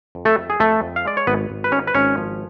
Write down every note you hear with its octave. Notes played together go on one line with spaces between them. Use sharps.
F2
A3 A4
F2
G#4
F2 A3 A4
F2
F5
G#3 D5
C#5
G#1 B3 B4
G#1
B4
G#2 C#4 C#5
B4
G#1 C#4 C#5
F3